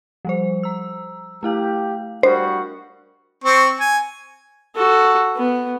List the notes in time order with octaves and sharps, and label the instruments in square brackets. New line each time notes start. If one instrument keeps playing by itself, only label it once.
[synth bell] F3 G3 C5
A#5 E6
[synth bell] A3 E4 F5 [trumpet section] G4
[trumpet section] G3 F#4 [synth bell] D4 A#4 [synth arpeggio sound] C5
[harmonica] C4 C#6
G#5
[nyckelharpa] F#4 A4
B3